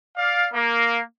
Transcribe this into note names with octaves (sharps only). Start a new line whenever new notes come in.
D5 F5
A#3